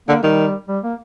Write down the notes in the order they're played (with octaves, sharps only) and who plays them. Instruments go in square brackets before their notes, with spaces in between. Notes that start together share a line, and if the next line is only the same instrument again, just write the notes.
[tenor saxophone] D3 [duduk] A#3
[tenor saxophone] D#3 [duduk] G3
[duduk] G3
A#3